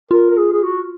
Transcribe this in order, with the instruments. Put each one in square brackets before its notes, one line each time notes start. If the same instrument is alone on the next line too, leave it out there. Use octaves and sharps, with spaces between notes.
[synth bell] F4 [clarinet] A#4
[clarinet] A#4
G#4
G#4
F#4